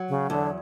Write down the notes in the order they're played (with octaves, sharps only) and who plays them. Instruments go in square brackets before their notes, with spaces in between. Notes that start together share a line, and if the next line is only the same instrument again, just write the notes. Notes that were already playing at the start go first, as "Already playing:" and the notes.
Already playing: [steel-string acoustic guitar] F#3
[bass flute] C#3
[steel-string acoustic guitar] E2 [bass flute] D3